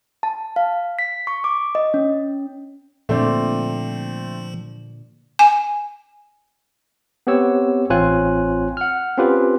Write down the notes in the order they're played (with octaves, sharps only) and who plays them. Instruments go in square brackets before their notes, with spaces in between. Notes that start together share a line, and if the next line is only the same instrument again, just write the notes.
[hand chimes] A5
F5
B6
C#6
D6
D#5
C#4
[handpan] A#2 D3 D5 [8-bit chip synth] F3 [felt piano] A3 C4
[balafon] G#5
[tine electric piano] B3 C4 G4 C#5 E6
A1 C4 F4 C#5 G#5 F#6
F#5 F6
C4 C#4 F4 G4 B4